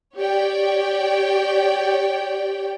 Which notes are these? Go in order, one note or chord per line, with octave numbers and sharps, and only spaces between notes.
G4 C#5 D5 G5